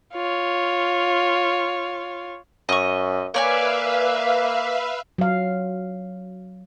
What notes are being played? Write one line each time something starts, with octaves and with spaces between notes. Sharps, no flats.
F4 C#5
F#2 D#5 C#6
A#3 B4 C#5 D5 E5 F5 G#5
F#3 F5